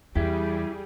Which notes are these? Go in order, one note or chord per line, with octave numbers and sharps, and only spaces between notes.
E2 G3 E4 G4 G#4